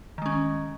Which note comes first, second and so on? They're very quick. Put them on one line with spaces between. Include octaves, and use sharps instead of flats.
D#3 G#3 C#4